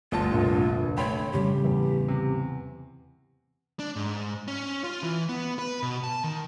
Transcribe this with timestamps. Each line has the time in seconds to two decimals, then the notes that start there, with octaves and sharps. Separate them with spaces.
0.12 G1 D2 F4 A5
0.32 F1 A#1 D3
0.98 A3 C#5 G5 B5 C6
1.33 A2 C#3 G3 G4
1.65 E2
2.08 C3
3.79 D4
3.96 G#2
4.48 C#4
4.84 F4
5.03 E3
5.29 B3
5.59 B4
5.83 B2
6.04 A5
6.24 D#3